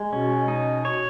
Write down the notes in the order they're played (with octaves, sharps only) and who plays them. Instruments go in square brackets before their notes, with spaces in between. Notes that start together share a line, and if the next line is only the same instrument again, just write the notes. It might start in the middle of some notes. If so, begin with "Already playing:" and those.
Already playing: [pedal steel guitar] G#3
[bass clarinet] B2 [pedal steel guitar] C#4
[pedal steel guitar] D#4
C#5